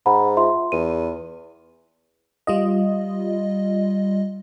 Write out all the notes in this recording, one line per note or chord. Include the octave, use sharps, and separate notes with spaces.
G#2 F#5 A#5 B5
F4 E5 C6
E2 D#7
G3 F4 D#5